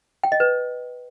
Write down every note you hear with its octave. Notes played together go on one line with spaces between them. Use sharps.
G5
D#5
B4